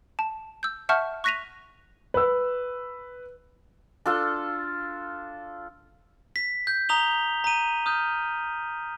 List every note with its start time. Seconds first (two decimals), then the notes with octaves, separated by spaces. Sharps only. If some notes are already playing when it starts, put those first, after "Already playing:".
0.19 A5
0.63 E6 G6
0.89 E5 F#5 A5 C#6 F6 G6
1.24 C#6 F#6 A#6 B6 D#7 F7
2.14 B4 E6
4.06 D4 F4 A4
6.36 B6
6.67 G6
6.89 A#5 D#6 F7 G7
7.44 A#5 D#7
7.86 D#6 F6 G6